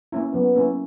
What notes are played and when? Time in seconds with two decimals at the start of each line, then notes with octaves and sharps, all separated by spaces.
0.12 A#3 C#4 E4
0.34 F#3 B3
0.55 A#3 C#4 E4